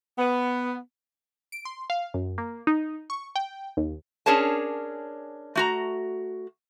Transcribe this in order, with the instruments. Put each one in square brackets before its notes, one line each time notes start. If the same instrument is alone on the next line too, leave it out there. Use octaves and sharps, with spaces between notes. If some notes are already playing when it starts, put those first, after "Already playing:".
[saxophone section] B3
[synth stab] D7
C6
F5
F#2
A#3
D#4
C#6
G5
D#2
[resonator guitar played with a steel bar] C#4 D4 G#4 A#4 C#5 A5
A3 F#4 A#5